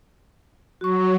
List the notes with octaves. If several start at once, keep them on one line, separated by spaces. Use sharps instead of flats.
F#3 F#4 C#6